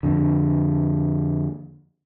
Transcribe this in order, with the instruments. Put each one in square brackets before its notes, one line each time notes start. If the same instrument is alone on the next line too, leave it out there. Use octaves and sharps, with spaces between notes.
[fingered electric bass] F2 D3